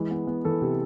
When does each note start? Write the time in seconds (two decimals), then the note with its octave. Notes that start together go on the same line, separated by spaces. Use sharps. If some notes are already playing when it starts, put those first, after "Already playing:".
Already playing: E3 G#3
0.11 B3
0.27 B3
0.45 E3 A4
0.62 C3